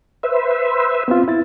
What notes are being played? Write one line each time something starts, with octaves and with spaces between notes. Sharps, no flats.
B4 C5 E5
B3 C4 F4
E4 A6